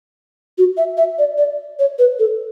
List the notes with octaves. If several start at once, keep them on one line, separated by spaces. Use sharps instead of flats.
F#4
E5
E5
D5
D5
C#5
B4
A4